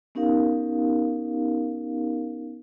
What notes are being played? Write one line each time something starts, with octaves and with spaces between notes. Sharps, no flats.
B3 C#4 D#4 G4 A#4 F5